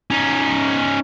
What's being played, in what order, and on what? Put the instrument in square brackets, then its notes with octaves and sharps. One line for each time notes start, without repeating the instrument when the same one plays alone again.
[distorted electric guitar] C#4 D#4